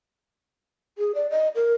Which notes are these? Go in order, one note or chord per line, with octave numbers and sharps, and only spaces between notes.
G#4
D5
D#5
A#4